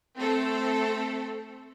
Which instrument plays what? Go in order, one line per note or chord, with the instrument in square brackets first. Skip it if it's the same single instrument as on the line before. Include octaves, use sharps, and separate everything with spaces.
[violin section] A3 C4 A4